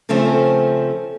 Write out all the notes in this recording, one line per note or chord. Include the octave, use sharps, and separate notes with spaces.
C#3 F3 A3 C4 C#4